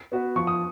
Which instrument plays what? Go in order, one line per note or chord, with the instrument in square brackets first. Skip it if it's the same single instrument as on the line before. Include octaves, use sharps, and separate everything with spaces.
[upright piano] B3 F#4 B4
[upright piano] F3 [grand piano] C#6
[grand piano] D#6